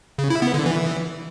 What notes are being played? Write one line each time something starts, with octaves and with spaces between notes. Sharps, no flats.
C#3
E4
B3
D3
E3